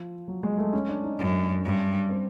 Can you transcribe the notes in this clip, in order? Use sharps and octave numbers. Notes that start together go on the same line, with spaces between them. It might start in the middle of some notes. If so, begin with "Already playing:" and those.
Already playing: F3
F#3
G#3
A3
C#4
D4
D#4
F#2 C#4
G2
C4